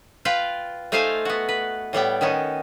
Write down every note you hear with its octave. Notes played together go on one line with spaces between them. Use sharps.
F4 B4 F5 G5
A3 D#4 F4 C5 F5 G#5
B3 F#4
B4
A2 G3 B3 G5
D#3 B3 C#4 D#4